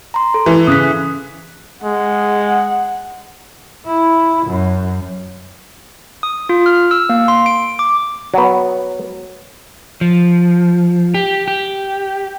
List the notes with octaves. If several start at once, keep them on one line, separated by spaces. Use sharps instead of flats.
A#5 C6
A4
E3
C#3 D#6 F#6 B6
G#3 F#5
E4
F#2
D#6
F4
F6
E6
A#3
C6
D7
D6
F#3 B3
F3
G4
G4